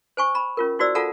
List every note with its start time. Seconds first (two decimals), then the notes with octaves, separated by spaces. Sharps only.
0.17 C5 G#5 C#6
0.35 A#5 B5
0.57 C#4 F4 A#4
0.79 E4 F#4 C5 D5 E6
0.95 F4 A4 F5 F#5 A5 A#5